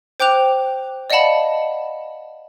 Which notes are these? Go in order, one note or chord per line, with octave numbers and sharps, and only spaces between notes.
C5 G5 D6 F#6 F7
D5 D#5 F5 F#5 A5 B5